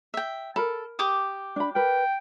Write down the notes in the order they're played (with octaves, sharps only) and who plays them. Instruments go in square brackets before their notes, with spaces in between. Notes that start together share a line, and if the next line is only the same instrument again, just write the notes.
[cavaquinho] E5 G5
[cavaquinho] A4 [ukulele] A#4 B5
[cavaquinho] G4 D6 D#6
[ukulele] D4 B5
[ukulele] A#4 B4 [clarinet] G5